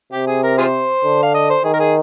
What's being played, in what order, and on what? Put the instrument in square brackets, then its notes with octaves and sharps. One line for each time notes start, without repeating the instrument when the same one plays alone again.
[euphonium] C3 [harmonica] G4
[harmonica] G#4
A#4
F4 G#4 C5
[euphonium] D3
[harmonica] F5
D#5
C5
[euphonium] D#3 [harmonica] G#4
[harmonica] A#4
G#4